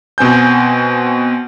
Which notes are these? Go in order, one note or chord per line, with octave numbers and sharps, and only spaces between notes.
B2 C4 G#5 G6